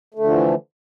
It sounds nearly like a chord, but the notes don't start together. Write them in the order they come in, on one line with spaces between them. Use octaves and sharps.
A3 D3 F3 E3